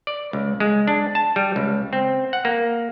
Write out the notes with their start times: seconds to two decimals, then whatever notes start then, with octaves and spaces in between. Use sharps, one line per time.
0.07 D5
0.33 C#2
0.60 G#3
0.87 D4
1.15 A5
1.36 G3
1.56 C#2
1.93 C4
2.33 F#5
2.45 A#3